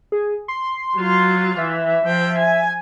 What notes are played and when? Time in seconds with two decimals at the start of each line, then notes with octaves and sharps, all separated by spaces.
0.12 G#4
0.48 C6
0.97 F#3 F4
1.58 E3 E5
2.06 F3 G5
2.38 G#5